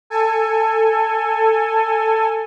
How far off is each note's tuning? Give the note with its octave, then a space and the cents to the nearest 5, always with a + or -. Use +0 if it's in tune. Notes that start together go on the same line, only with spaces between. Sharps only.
A4 +15 G#5 +0